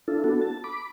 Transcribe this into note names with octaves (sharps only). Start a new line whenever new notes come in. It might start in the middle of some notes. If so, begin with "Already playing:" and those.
D4 E4 F4 A4
B3 D4 F#4 A4
A5
B5 D6